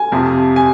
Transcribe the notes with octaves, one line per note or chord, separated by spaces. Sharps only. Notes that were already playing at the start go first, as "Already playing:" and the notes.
Already playing: G#5
F2 C3 F3
G#5